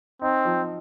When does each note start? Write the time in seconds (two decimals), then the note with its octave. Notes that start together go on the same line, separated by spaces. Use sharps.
0.22 C4 D#4
0.45 F3